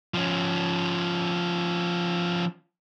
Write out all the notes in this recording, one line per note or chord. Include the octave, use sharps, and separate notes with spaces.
F3 C#4